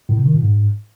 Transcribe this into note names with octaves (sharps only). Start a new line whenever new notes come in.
A2
C3
D#3
A#2
G#2